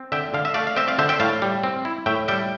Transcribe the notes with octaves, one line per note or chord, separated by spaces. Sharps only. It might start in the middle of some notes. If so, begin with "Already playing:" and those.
Already playing: C4
D3 E5 G5
D3 F5
E5
A3 D5 F5
F5
C4 E5 G5
D5 F5
D3 C5 E5
E5 G5
A2 F5 A5
G3
C4
E4
A2 E5 G5
G3 E5 G5